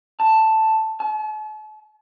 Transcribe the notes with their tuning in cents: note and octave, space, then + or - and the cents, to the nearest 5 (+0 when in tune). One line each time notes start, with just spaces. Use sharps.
A5 +5
A5 -45